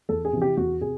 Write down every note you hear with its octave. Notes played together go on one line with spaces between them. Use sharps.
E2 A4
G#4
C3 E3
G4
E2 F#4
C3 G#4